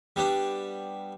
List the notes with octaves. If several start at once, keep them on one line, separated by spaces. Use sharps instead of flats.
G3 B3 D4